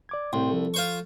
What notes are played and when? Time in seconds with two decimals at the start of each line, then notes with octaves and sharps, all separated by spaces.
0.09 D5 D6 G#6
0.33 C2 A2 G5 C6
0.50 F3 A4
0.74 F4 C5 C#6